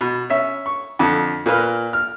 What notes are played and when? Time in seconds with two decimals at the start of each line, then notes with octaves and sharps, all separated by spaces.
0.01 B2
0.30 C#4 E5
0.66 C#6
0.99 F2 D3
1.46 A#2 A#3 B4 F6
1.93 F6